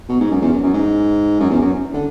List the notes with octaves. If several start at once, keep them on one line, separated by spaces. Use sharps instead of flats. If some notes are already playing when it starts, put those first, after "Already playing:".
B2
G#2
F#2
E2
F#2
F#2
G#2
F#2
E2
F#2
D3